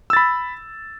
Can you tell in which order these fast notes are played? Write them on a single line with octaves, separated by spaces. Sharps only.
E6 A6 B5